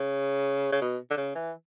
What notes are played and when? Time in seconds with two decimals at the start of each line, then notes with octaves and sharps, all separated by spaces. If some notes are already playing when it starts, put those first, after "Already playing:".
Already playing: C#3
0.72 C#3
0.82 B2
1.10 D3
1.17 C#3
1.35 E3